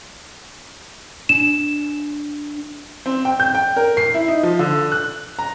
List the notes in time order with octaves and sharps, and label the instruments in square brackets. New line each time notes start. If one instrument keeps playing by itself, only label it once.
[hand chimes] D4 [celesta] E7
[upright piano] C4
G5
G6
G5
A#4
C7
E4
D#4
F3
D3
F#6
A#5